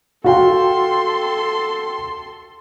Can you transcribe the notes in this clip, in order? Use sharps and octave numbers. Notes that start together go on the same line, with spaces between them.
F#4 A4 F5 G5 C6